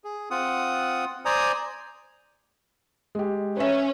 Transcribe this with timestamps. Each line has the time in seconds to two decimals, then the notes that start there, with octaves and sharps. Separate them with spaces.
0.04 G#4
0.31 C4 F4 F#5 D#6
1.25 C5 D5 G#5 A#5 D#6
3.15 G#3 G4
3.57 C#4 B4 E5